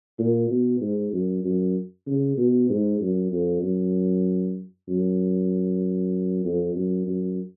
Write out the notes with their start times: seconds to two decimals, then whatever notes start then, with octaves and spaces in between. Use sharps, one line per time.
0.19 A#2
0.51 B2
0.81 G#2
1.13 F#2
1.44 F#2
2.07 C#3
2.37 B2
2.70 G#2
3.01 F#2
3.32 F2
3.63 F#2
4.89 F#2
6.45 F2
6.75 F#2
7.07 F#2